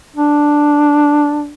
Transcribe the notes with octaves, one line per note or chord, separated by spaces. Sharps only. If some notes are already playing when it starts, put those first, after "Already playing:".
D4